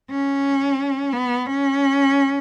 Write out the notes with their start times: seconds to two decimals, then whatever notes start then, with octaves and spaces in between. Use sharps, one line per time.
0.10 C#4
1.12 B3
1.46 C#4